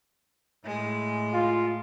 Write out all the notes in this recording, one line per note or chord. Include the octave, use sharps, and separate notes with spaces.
A2 G#3
F4